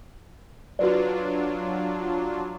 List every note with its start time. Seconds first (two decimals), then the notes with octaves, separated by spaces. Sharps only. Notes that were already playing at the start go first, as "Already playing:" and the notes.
0.79 F#3 D4 F4 F#4 B4 D5